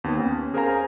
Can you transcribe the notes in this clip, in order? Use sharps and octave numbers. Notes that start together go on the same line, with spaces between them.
D#2 B3 C4
C#4
G#4 A#4 C5 F5 G#5 A#5